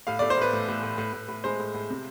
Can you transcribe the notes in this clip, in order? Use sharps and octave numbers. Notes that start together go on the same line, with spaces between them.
A2 F5
A3 D5
C5
A2 B4
A2
A2
A2
A2
A2
A2
G#3 C5
A2
A2
C3